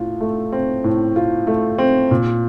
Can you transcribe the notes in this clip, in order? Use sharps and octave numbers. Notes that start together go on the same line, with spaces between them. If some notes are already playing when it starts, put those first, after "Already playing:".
Already playing: A2 F4
A3
C4
A2
F4
A3
C4
A#2